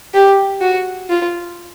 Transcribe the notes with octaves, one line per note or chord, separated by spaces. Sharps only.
G4
F#4
F4